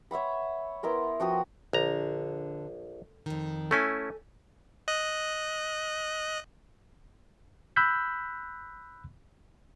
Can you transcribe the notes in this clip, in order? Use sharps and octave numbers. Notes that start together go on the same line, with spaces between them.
C#5 E5 F#5 B5
B3 E4 A#4 C6
F3 F#4 G5 D#6
A#1 D3 A#5
F2 D#3
A3 C#4 E4 A4 G#5
D#5 F#6
B5 E6 F#6 G6 B6